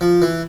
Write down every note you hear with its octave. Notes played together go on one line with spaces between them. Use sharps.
F3
E3